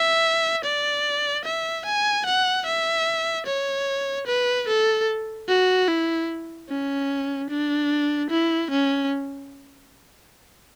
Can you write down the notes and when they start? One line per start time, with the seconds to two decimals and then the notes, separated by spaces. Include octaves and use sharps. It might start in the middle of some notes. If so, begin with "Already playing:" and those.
Already playing: E5
0.65 D5
1.45 E5
1.85 G#5
2.26 F#5
2.66 E5
3.46 C#5
4.27 B4
4.68 A4
5.48 F#4
5.88 E4
6.69 C#4
7.50 D4
8.30 E4
8.71 C#4